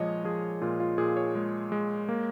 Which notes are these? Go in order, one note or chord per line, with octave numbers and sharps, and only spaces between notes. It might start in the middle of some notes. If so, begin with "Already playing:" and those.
Already playing: A#2 F3 G#3 C#5 D#5
F3 G#4
A#2 F4
F4
A#2 G#4
C#5
G#3
G#3
A#3